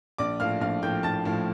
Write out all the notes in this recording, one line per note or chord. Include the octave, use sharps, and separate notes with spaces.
A#1 D5 D6
A2 F3 F5 F6
A#1 F5 F6
A2 F3 G5 G6
A#1 A5 A6
A2 F3